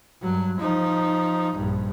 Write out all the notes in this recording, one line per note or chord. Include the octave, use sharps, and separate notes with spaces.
G2 F#3
F3 D#4
A#1 G2